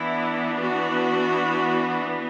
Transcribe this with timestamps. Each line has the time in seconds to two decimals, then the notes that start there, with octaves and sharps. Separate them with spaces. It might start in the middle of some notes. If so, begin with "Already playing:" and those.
Already playing: E3 B3 D4 E4
0.57 F#4